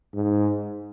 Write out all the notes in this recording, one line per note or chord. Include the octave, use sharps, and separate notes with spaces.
G#2